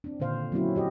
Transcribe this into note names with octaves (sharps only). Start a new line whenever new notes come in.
C4 D4
A#2 D3 D#3 C5 F5
F#3 A#3 C4 C#4 E4 F#4
F#4 G4 D#5